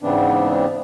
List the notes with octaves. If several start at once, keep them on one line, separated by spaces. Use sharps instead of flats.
G#2 C#3 E3 B3 C4 D4